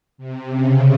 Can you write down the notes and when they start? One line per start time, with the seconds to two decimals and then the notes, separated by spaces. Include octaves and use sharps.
0.18 C3
0.50 C#3